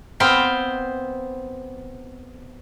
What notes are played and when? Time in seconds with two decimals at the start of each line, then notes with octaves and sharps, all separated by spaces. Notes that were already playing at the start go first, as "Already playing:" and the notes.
0.20 B3 C4 C5 F5 G5